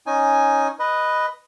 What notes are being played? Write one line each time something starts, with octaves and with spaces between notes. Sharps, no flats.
C#4 D#4 G#5
B4 D#5